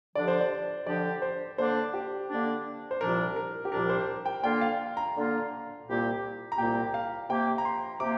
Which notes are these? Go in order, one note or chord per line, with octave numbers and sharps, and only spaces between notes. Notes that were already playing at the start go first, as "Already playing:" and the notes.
D3 F3 D4 G4 D5
C5
D5
D3 F3 D4 G4 D5
C5
D3 A#3 D4 C5
G4
D3 A#3 D4
C5
C2 A#2 F3 D4 A#4
A#4
G4
C2 A#2 F3 D4 A#4
C5
G5
D3 A#3 D4 F4 G5
F5
A#5
D3 A#3 D4 F4
C2 A#2 A#3 G4
A#5
C2 A#2 A#3 G4 G5
F5
C3 A#3 G4 G5
A#5
C6
C3 A#3 G4 D6